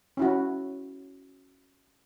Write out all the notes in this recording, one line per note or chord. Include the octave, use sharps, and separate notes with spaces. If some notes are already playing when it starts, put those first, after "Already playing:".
C#4 E4 F#4